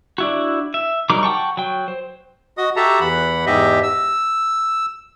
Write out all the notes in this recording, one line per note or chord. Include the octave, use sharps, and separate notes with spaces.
D4 E4 F#4
E5
F#3 G3 D#4 A#4 D6
F#5 G5 A5 C#6
F#3 G5
C5
F#4 D#5 D#6
F#4 G4 A4 E5 A5 A#5
E2 E3 F#5 B5
E2 G#2 G4 D#5 E5
E6